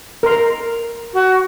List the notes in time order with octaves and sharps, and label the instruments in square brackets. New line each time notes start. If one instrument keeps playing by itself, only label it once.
[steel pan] A#4 C6
[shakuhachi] F#4